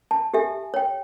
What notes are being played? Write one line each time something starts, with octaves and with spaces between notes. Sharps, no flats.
A5
G4 A4 E5 G#5
C#5 G5